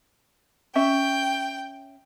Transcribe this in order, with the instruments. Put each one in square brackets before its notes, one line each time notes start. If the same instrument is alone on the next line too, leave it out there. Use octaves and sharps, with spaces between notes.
[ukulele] C#4 E5 [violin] G5